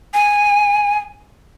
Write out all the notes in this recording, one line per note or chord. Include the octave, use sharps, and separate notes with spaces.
G#5